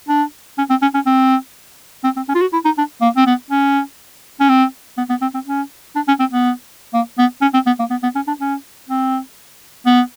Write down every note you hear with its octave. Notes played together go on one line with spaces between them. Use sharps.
D4
C#4
C4
C#4
C#4
C4
C4
C4
C#4
F4
F#4
E4
D#4
D4
A#3
C4
B3
C#4
C#4
C4
B3
B3
C4
C4
C#4
D4
C#4
C4
B3
A#3
B3
C#4
C4
B3
A#3
B3
B3
C#4
D4
C#4
C4
B3